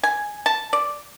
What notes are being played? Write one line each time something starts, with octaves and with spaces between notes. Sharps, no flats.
G#5
A5
D5